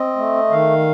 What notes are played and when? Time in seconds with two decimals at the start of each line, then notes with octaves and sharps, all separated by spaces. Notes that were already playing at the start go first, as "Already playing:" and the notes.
Already playing: C4 D#5
0.16 A3
0.51 D#3 F5